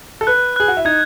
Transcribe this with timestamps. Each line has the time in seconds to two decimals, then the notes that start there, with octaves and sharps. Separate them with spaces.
0.21 A4
0.27 B4 F#6
0.56 G#4 F#6
0.68 F#4
0.77 E4
0.85 D#4 G#6